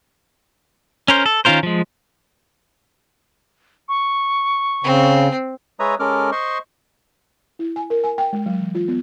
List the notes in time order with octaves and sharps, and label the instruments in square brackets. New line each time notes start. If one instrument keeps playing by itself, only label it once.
[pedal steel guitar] C#4 A#4 C5
A4
D#3 C#4 F4 A#4 C5
F3 G#3
[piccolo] C#6
[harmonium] C#3 [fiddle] C4
[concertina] G#3 B4 C#5 E5 A#5 D#6
G#3 C#4 A4 A#4 D6 F6
C5 D#5 C6 C#6
[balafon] E4
G#5
A#4
G#5
G5
G#3
F#3
E3
F4
B3